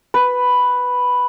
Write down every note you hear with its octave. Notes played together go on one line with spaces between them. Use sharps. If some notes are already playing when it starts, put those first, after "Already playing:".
B4